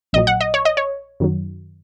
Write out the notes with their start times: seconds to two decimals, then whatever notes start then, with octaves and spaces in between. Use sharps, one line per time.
0.13 A#1 A#2 F#3 D#5
0.27 F#5
0.41 D#5
0.54 C#5
0.65 D#5
0.77 C#5
1.20 F#2 D#3 F#3